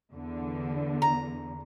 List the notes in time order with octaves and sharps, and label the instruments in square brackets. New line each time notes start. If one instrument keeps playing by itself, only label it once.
[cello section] E2 D3
[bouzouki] A#5